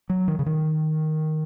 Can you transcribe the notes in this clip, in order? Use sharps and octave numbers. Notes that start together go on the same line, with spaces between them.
F#3
D#3
C#3
D#3